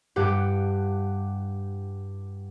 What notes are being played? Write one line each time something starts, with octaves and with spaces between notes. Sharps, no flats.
G2 G4 F#5